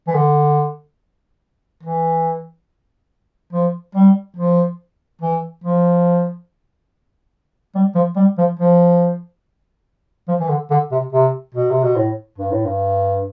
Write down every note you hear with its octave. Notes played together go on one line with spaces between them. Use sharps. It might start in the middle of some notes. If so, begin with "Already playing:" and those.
E3
D3
E3
F3
G3
F3
E3
F3
G3
F3
G3
F3
F3
F3
E3
D3
D3
C3
C3
B2
C3
B2
A2
G2
A2
G2